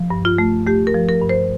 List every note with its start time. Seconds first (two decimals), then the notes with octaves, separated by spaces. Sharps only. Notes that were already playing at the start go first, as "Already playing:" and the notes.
Already playing: F3
0.10 G2
0.25 F4
0.38 A3
0.67 A3 G4
0.87 A#4
0.95 F3
1.09 A#4
1.22 G2
1.29 C5